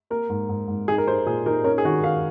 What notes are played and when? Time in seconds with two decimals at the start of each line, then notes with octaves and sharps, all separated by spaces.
0.10 A#3 A#4
0.29 G#2
0.49 G#2
0.68 G#2
0.88 D#4 G#4
0.98 A#4
1.07 D#4 C5
1.26 A#2 G#4
1.46 D#4 A#4
1.64 C#4 A#4
1.78 G#4
1.85 D#3 F#4
2.03 D#3 F5